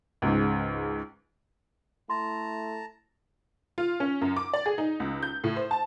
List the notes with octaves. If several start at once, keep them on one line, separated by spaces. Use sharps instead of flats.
C#2 G#2
A3 E4 A5 A#5 C6
F4
C#4
F#2
D6
D5
G#4
D#4
C#2
G6
A2
C5
A5